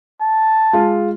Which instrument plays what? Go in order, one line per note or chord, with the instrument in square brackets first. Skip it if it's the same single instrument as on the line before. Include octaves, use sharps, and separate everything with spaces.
[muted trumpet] A5
[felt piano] G#3 F4